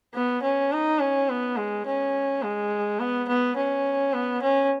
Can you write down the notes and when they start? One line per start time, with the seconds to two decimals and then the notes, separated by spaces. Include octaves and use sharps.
0.14 B3
0.43 C#4
0.72 D#4
1.00 C#4
1.29 B3
1.57 G#3
1.86 C#4
2.42 G#3
2.99 B3
3.28 B3
3.56 C#4
4.14 B3
4.42 C#4